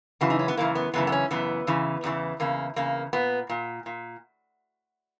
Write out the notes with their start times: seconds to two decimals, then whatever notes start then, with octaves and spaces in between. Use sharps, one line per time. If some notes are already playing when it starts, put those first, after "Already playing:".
0.21 F#2 C#3 E3 F#4
0.30 D#4
0.39 C#4
0.48 B3
0.57 F#2 C#3 E3 A#3
0.75 B3
0.94 F#2 C#3 E3 B3
1.07 B3
1.12 C#4
1.30 F#2 C#3 E3 B3
1.67 E2 C#3 E3
2.04 E2 C#3 E3
2.40 E2 C#3 A#3
2.76 E2 C#3 A#3
3.13 A#2 B3
3.50 A#2
3.86 A#2